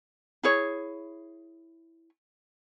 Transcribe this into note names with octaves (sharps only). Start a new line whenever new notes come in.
E4 G#4 C#5